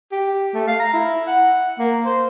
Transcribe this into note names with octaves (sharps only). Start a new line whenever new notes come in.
G4
A3
F5
A#5
E4
F#5
A#3
C5